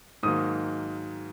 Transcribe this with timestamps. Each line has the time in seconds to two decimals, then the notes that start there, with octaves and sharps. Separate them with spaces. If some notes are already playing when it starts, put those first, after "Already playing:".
0.23 G#2 D#3 F#3 A#3 D#6